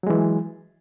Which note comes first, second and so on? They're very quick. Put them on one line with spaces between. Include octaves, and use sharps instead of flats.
F#3 G#3 E3